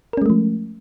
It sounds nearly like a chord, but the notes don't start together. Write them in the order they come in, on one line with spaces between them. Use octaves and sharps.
A#4 C#4 G#3 A3 F3